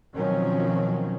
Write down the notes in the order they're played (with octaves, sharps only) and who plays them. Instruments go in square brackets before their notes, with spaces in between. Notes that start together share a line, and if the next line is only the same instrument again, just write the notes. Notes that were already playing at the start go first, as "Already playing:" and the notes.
[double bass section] B2 D#3 F3 F#3 C4 C#4